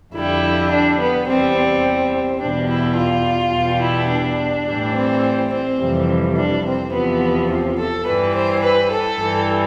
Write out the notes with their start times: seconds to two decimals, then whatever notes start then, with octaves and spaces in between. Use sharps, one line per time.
0.13 F2 D3 G3 E4
0.70 D4
0.99 B3
1.26 E2 C3 G3 C4
1.55 C4
2.40 E2 B2 G3 D4
2.69 E4
2.97 F4
3.53 E2 B2 G3
3.82 E4
4.09 D4
4.67 A2 E3 G3
4.94 C4
5.51 C4
5.80 F2 C3 E3 G3
6.36 D4
6.64 C4
6.92 E2 C3 F3 B3
7.49 C4
7.78 A4
8.05 G2 E3 G3 B4
8.34 C5
8.62 B4
8.90 A4
9.19 G2 E3 G3